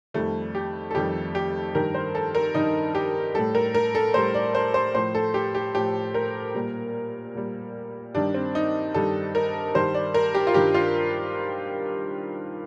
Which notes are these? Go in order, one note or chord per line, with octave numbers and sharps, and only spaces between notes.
F2 D#3 G3 A3
G4
A4
F2 D#3 G3 G4
G4
G2 D#3 G3 A#4
C5
A4
A#4
G2 D#3 G3 D#4
G4
A2 G3 A4
A#4
A#4
A4
A2 G3 C5
D5
C5
C5
A2 F3 C5
A4
G4
G4
A2 F3 G4
A#4
A#2 G3
A#2 G3
G2 D#3 G3 D4
C4
D#4
G2 D#3 G3 A4
A#4
G2 D#3 G3 C5
D5
A#4
G4
F4
G2 D#3 G3 G4
F4